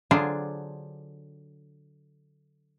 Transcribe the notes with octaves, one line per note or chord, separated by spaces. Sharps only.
D3 F#3 D4 F4 G#4 C5